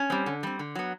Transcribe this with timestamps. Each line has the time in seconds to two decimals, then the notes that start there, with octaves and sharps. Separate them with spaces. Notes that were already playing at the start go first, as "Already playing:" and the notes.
Already playing: C#4
0.10 G3 C4
0.26 D3
0.43 G3 C4
0.59 D3
0.75 F#3 B3